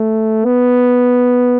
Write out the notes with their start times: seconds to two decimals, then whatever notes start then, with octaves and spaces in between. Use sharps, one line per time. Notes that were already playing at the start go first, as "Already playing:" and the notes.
Already playing: A3
0.45 B3